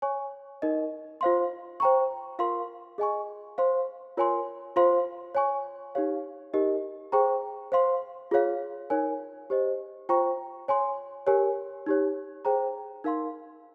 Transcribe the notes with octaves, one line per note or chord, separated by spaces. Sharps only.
C#5 G#5 C#6
D#4 A#4 D#5
F4 C5 F5 C6
C5 G5 A#5 C#6
F4 A#4 F5 C6
G#4 D#5 G#5 C#6
C5 F5 C6
F4 A#4 C#5 G#5 C6
F4 C5 F5 C6
C#5 G#5 C#6
D#4 G4 C#5 F5
D#4 G4 A#4 D#5
G#4 C5 G5 A#5 C#6
C5 F5 C6
F4 G#4 C#5 F5
D#4 A#4 C#5 G#5
G4 C5 D#5
F4 C5 G5 A#5 C#6
C#5 G#5 C6
G4 A#4 C#5 G#5
D#4 G4 C#5
G#4 C5 G5 A#5
D#4 A#4 F5 C6